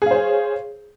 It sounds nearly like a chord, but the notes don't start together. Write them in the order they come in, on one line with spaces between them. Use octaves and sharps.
G#4 F5 C5 C#5